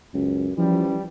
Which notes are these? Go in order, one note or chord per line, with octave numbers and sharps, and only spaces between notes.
C#2 F#2
E3 F3 G3 C#4